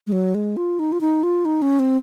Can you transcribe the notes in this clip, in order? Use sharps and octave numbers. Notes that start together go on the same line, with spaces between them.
G#3
F#3
G#3
F4
D#4
F4
D#4
F4
D#4
C#4
C4